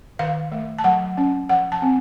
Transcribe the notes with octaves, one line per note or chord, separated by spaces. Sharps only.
D#3 F5
A3
A5
F#3 F#5
C#4
F3 F#5
A5
C4